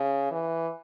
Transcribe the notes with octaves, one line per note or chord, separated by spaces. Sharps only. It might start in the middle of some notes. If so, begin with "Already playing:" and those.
Already playing: C#3
E3